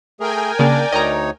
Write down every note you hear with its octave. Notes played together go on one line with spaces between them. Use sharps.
A3 G#4 A#4 G5 G#5
C#3 A#3 D4 D5
D2 D#4 C#5 D#5 A#5